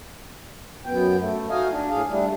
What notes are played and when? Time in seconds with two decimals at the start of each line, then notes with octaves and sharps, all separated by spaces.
0.86 F#2 B3 G5
1.20 A3
1.50 D#4 F#4 D#5 F5 G#5
1.71 D4
1.90 A2 G#4 F5
2.09 G3 A3 D4